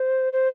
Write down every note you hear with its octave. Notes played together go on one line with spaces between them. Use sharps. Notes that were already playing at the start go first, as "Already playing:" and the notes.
Already playing: C5
C5